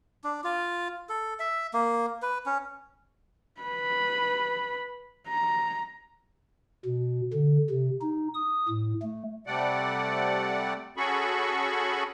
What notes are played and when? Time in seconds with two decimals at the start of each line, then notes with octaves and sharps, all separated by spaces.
0.24 D4
0.44 F4
1.09 A4
1.39 E5
1.74 A#3
2.22 B4
2.46 C#4
3.61 B4 B5
5.28 A#5
6.85 B2
7.33 D3
7.70 C3
8.01 D#4
8.34 D#6
8.69 A2
9.02 A3
9.47 C3 G3 A3 D5 F#5
10.97 C#4 F#4 G#4 A4 B5 C#6